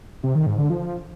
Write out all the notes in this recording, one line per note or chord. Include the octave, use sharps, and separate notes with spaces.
C3
D#3
G#2
D3
F3